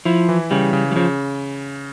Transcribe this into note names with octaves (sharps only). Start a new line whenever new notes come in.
F3 E4
E3
C#3 G3
C#3
G3
C#3 F3